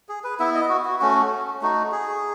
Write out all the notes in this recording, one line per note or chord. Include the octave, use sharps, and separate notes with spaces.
G#4
B4
B3 E4 E5
D#5
F#4
F#4
A3 C#4 F#4
A3 D#4 F#4
G#4